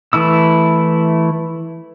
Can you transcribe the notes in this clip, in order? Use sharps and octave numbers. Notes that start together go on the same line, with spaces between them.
E3 A3 E4 E6